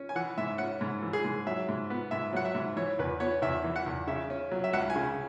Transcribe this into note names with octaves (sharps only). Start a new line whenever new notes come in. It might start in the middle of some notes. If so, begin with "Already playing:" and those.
Already playing: C#4
G#5
E3 F#5
G#2 E5
C#4 F#5
G#2
E3
G#4
G#2
F#3 E5
G#2
B3
G#2 E5
F#3 F#5
E5
G#2
E3 C#5
E2 B4
B3 C#5
E2 E5
E3
F#5
E2
C#3 E5
C#4
F#3
E5
C#2 F#5
G#5
C#3